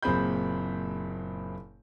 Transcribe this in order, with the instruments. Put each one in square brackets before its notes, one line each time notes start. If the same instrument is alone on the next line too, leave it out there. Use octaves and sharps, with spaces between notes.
[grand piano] F#1 A#2 C4 G#4 B5 G6